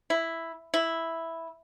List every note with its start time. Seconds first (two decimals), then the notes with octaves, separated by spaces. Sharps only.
0.10 E4
0.74 E4